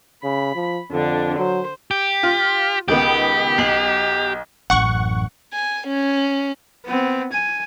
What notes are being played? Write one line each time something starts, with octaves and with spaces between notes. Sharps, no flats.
C#3 B5
F3
F2 D3 D4
F#3 C5
G4
F4
C#2 D#3 B3 G4
B1 C7 F#7
A1 F#2 F#5 C#6
G#5
C#4
B3 C4
G#5